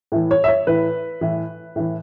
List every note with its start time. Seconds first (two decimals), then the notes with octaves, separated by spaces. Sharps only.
0.12 A2 E3
0.31 C#5
0.44 E5
0.48 C#5
0.67 A2 E3 B4
1.21 A2 E3
1.76 A2 E3